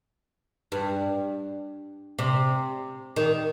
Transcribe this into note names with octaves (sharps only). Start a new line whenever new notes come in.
G2
C3
D#3